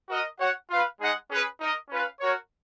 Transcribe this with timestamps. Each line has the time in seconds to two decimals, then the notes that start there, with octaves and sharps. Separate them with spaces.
0.10 F#4 A#4 D#5
0.40 F#4 C#5 F#5
0.70 F4 B4 F5
1.00 G#3 D#4 G#4 D#5 F#5
1.30 C#4 G#4 B4
1.60 D#4 A#4 D#5
1.90 C#4 F4 B4 F5
2.20 F#4 A#4 C#5